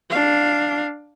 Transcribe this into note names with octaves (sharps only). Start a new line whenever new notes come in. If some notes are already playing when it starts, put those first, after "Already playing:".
D4 F5